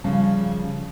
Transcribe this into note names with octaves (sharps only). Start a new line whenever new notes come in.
C#3 F3 G3 C#4